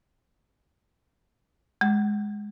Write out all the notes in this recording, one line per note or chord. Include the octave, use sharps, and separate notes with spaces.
G#3